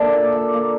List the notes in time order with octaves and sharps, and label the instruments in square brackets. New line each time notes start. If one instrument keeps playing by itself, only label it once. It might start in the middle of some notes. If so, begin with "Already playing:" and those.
Already playing: [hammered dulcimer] D3 A#3 D4 A#4 D5 E5
A#2
A#2
A#3